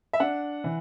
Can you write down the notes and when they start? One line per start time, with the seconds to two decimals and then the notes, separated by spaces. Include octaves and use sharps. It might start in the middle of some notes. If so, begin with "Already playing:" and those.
0.13 E5
0.20 D4 F#5
0.64 E3